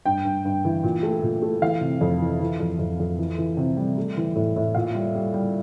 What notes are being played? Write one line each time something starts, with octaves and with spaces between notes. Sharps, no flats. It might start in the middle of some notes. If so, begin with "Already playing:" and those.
G2 G5
G2
G2
E3
A#2
A3
A#2
A3
E3 F5
C3
F2
E3
E3
F2
F2
F2
E3
E3
C3
G3
A3
E3
A2
A2
A#2 F5
G3
G3
G3